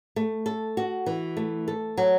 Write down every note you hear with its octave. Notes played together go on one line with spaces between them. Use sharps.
A3
A4
F#4
E3
A3
A4
F#3